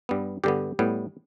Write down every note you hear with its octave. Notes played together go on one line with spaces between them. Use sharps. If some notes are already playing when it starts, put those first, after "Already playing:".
G2 G3 B3
G2 D3 B3 G4
A2 G3 B3